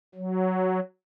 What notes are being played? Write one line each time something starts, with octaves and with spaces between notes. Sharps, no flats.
F#3